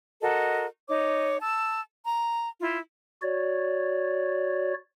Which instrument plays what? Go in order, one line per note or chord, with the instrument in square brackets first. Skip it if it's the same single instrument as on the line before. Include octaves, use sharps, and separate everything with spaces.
[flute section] F#4 A4 A#4 D#5
D#4 C#5 D6
A5 E6
A#5
E4 F4
[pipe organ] F#4 C#5 D5